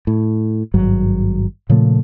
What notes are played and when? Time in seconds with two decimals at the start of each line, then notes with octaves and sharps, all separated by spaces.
0.07 A2
0.74 G#1 G2 F#3
1.69 A#2 C#3 F3 A3